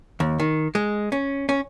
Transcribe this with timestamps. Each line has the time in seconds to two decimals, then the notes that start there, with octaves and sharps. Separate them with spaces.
0.20 D#2
0.40 D#3
0.75 G#3
1.12 C#4
1.49 C#4